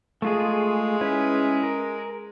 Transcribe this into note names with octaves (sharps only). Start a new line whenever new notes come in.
G#3 A3 F4 G#4
C#4 E4 B4
A#4